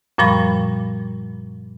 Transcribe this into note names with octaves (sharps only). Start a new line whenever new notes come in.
F#2 A#2 F3 G3 B5 C#6